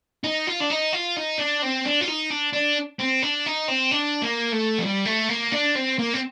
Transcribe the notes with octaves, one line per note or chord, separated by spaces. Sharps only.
D#4
F4
D4
D#4
F4
D#4
D4
C4
D4
F4
D#4
D4
D4
C4
D4
D#4
C4
D4
A#3
A3
F3
G3
A3
A#3
D4
C4
A#3
C4